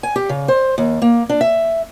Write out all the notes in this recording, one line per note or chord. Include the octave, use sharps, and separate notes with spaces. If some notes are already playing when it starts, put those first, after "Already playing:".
G#5
G4
C#3
C5
D#2
A#3
D4
E5